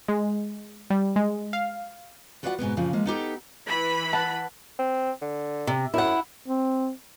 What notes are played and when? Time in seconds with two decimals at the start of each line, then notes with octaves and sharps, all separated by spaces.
0.08 G#3
0.90 G3
1.16 G#3
1.53 F5
2.43 F4 F#4 B4 D5 E5 F#5
2.58 G#2 B2 G#3 B3
2.77 F#2 A#2 C#3 F3
2.93 F3 G#3 A#3
3.05 B3 D#4 G4 A4
3.68 E3 B5
4.13 F#5 A5
4.79 C4
5.21 D3
5.67 C3
5.94 F#2 E4 F#5
6.48 C4